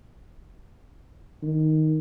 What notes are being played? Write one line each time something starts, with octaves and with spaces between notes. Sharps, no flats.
D#3